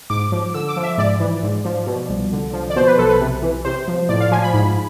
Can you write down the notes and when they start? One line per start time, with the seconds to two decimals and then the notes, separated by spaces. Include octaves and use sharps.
0.10 G#2 D6
0.32 F3
0.54 D3 E6
0.69 D6
0.76 F3
0.83 E5
0.98 G#2 D5
1.20 E3
1.43 G#2
1.65 F3
1.87 B2
2.09 C2
2.32 D3
2.53 F3
2.70 D5
2.76 B2 C5
2.87 B4
2.98 B1 A4
3.09 B4
3.21 C3
3.42 E3
3.65 C3 C5
3.88 F3
4.09 A2 D5
4.20 F5
4.31 F3 G#5
4.43 B5
4.54 G#2 B5